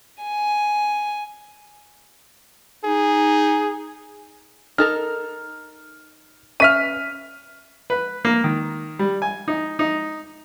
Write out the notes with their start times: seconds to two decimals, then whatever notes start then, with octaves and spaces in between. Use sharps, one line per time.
0.24 G#5
2.84 D#4 G#4
4.78 D#4 A4 A#4 F6
6.60 C#4 B4 E5 F5 F6 B6 D#7
7.90 B4
8.25 A#3
8.44 D#3
8.99 G3
9.22 G#5
9.48 D#4
9.79 D#4